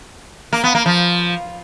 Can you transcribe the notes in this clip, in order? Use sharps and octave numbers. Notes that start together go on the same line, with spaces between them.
A#3
B3
A#3
F3